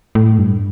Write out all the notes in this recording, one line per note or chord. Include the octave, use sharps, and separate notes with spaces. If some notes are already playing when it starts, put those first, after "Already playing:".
A2
G2